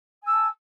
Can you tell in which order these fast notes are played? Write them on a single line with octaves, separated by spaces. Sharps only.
G#5 E6 A5